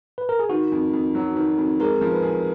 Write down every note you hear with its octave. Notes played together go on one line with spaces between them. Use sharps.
B4
A#4
G#4
D#3 F#4
F2
F2
F#3
D#3
F2
G#3 A#4
F3
B4
G#4